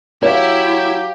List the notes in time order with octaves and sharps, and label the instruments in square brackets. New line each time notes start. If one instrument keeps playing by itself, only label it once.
[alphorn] F#3 [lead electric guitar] E4 [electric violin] G4 [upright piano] C#5 F5